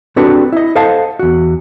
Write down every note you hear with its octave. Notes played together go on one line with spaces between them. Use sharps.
C4 D4 F#4 G4 A4 B4
E4 D#5
A4 C5 D#5 F5 F#5 A5
E2 F#4